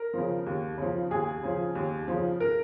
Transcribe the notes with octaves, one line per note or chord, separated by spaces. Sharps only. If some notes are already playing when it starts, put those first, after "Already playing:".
Already playing: A#4
C#3 F3
D#2
C#3 F3
D#2 G#4
C#3 F3
D#2
C#3 F3
A#4